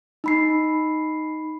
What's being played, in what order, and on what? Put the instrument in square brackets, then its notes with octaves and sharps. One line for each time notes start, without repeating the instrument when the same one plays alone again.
[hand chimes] D#4 B5 C7